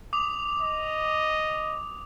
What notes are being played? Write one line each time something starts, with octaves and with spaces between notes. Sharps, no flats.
D6 D#6 F7
D#5